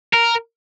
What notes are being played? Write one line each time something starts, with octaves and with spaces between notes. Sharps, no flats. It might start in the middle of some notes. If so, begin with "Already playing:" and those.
A#4